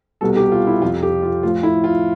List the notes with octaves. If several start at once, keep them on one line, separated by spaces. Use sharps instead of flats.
C2 B2 G3 A4
G4
F4
E4
F2 C3 F3 F4
G4
F4
A2 F3 F4
E4
F4